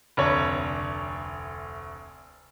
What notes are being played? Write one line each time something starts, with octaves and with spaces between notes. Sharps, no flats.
F1 D2 C#5 D5